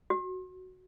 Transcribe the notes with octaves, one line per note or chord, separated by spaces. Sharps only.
F#4